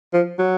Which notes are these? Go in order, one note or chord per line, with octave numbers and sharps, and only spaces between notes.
F3
F#3